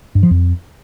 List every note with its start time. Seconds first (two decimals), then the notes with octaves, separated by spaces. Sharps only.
0.15 G2
0.23 F3
0.31 F2